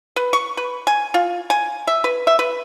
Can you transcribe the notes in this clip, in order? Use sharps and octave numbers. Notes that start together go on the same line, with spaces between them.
B4
C#6
B4
G#5
F4
G#5
E5
B4
E5
B4